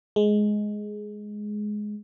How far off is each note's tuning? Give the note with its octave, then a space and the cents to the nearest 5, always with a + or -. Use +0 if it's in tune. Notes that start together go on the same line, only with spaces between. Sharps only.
G#3 +10